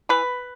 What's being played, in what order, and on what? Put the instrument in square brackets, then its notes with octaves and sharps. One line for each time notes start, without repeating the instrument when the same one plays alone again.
[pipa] E3 B4